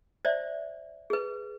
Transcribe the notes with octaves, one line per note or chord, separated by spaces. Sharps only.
C5 D5 E5
G#4 B4